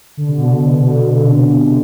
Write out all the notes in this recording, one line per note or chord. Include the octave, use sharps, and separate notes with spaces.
D3
C3
B2 D3